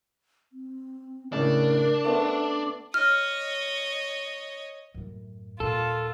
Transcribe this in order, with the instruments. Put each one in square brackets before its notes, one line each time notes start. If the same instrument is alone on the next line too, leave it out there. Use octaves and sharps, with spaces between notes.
[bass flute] C4
[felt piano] A2 C#3 [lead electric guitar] D4 [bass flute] A#4
[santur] A3 B3 C#4 [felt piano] C5
[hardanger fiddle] C#5 D#5 [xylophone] F6
[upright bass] F#2 A2
[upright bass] D#1 A#2 [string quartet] F4 [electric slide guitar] A4